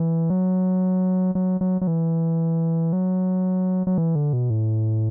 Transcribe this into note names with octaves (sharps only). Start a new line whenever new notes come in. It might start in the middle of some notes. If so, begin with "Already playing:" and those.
Already playing: E3
F#3
F#3
F#3
F#3
E3
F#3
F#3
E3
D3
B2
A2